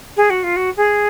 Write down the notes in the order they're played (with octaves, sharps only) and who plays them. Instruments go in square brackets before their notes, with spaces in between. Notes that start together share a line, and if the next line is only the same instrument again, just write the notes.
[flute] G#4
F#4
F4
F#4
G#4